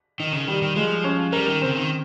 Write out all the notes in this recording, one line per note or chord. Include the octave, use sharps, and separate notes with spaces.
D#3 D#4
C#3
D#3 G3
D#3
F3 G#3
C#4
G3 A#4
D#3
C#3 C4
D#3